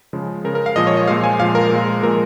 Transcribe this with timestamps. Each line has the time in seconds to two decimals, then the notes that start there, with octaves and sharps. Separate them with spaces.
0.13 C#3 F3 G#3
0.44 C#3 G#3 A#4
0.55 A#4
0.66 F5
0.76 A#2 F3 G#3 D#5
0.87 C#5
0.97 D#5
1.07 A#2 F3 G#3 F5
1.24 G#5
1.40 A#2 F3 G#3 F5
1.55 A#4
1.71 A#2 G#3
2.03 A#2 F3 G#3 A#4